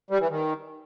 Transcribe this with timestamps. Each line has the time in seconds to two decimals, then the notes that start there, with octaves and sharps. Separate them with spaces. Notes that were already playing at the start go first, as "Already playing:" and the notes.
0.10 G3
0.20 E3
0.30 D#3